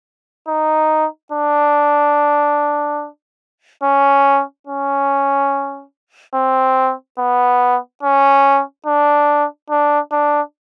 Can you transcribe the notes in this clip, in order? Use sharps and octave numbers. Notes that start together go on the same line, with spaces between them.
D#4
D4
C#4
C#4
C4
B3
C#4
D4
D4
D4